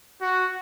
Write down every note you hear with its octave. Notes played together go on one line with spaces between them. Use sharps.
F#4